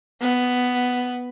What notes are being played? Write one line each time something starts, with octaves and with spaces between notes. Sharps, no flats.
B3